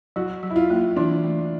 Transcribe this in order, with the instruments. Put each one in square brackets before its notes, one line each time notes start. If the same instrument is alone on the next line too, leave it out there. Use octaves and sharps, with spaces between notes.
[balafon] F#3 [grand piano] F#4
[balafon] F#3
[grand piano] E4
F4
[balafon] A#3
[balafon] E3 [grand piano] D4
[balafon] A3